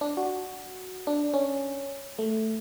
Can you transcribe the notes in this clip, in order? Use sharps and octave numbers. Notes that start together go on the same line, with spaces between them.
D4
F#4
D4
C#4
A3